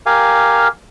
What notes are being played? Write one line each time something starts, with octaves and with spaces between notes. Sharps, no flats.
G4 A#4 F5 G#5